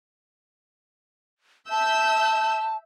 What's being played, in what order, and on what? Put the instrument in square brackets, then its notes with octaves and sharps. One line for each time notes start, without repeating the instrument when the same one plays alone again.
[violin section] E5 E6 G6 [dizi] A5